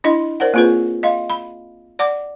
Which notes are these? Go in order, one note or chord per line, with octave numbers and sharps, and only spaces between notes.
D4 E4 D#5 C6
A#4 C5 D5 F#5
A#3 C4 F4 G#4 B4
D#5 F5 C6
B5
D5 F#5 D6